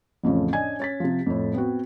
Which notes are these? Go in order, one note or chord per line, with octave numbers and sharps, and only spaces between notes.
A1 F2 A2 C#3 F3
C#4 D4 D#5 G#5 G#6
C#4 A6 B6
C3 F3
F2 A2
B3 C4 F#4